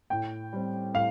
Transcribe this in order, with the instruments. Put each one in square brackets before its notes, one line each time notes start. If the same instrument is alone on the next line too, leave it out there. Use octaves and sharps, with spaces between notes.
[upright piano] A2 [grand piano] G5
[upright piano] G3 C4
[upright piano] A2 [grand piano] F5